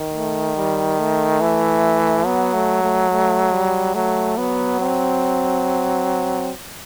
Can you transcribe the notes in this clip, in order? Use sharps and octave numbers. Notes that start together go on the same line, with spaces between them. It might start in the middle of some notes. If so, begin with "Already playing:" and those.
Already playing: D#3
A3
G3
A3
E3
F#3 B3
A3
A3
A3
G3
F#3 A3
F#3 B3
C4